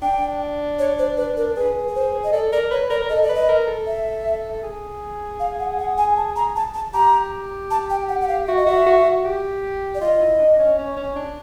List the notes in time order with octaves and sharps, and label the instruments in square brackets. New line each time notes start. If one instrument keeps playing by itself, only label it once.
[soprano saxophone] D4 [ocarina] G5
[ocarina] C#5
C5
B4
A#4
[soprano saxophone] G#4 [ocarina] B4
[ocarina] B4
C5
D#5
[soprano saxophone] A4 [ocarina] D5
[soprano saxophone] A#4 [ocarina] D5
[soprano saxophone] B4 [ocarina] C#5
[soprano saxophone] A#4 [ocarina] D5
[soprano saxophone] A#4
[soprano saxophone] A4 [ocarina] D#5
[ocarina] D5
[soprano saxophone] B4
[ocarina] D#5
[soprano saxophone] A#4
A4
[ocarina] E5
[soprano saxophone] G#4
[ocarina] F5
F#5
F#5
G#5
A5
A#5
A5
A5
[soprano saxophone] G4 [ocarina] A#5
[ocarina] A5
G5
F#5
F#5
F5
[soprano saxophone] F#4 [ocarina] E5
[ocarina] D#5
[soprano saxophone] F#4 [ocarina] E5
[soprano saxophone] F#4
F#4
G4
[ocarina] D5
[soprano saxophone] F4 [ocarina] D#5
[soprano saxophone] E4
D4
C#4
C#4
C#4
D4